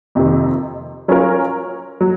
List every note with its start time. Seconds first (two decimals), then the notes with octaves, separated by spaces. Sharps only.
0.15 F2 C3 D#3
1.08 F#3 C#4 F4 A#4
2.01 F#3